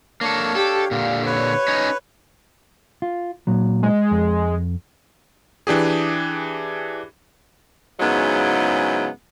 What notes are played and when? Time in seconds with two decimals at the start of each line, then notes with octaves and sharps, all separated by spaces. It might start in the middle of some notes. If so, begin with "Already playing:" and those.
0.21 A#3 D4 A4 C#5 F5
0.55 G4 A4
0.91 A#2 D3 F5
1.26 B4 C#5
1.68 C#4 D#4
3.02 F4
3.47 A#2 F#3
3.83 G#3
4.11 F2
5.67 E3 D4 G4 G#4
8.00 G#2 C#3 F#3 G#3 B3 E4